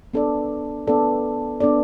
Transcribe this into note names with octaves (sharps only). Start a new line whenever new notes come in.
B3 D4 A4 D5
B3 D4 A4 D5
B3 D4 A4 D5